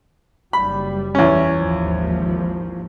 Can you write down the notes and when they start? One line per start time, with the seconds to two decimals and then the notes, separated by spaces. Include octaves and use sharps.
0.53 F#1 G3 B5
1.15 E2 C#4
1.55 G#1 D#2 F3